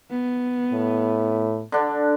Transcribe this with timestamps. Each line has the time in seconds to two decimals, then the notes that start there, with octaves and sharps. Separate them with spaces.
0.11 B3
0.73 A2
1.72 D3 D4